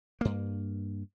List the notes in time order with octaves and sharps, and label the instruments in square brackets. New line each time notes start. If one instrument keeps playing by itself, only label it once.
[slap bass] G2 A#3